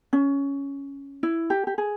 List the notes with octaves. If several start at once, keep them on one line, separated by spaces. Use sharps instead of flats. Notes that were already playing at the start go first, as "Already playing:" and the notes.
C#4
E4
G4
G4
G#4